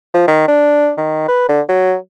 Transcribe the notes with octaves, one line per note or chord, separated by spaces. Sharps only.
F3
D#3
D4
D#3
B4
D3
F#3